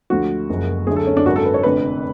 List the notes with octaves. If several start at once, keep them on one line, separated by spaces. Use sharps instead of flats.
D2 D3 F3 F#4
F#1 F#2 F3 G#3
D2 D3 F#3 A3 G#4
A4
C#4
D4
G#1 F#2 D3 F#4
A4
B4
C#5
F1 F2 D3 B4